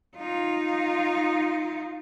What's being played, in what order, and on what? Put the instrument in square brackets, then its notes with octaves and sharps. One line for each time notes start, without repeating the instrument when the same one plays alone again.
[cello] D#4 F4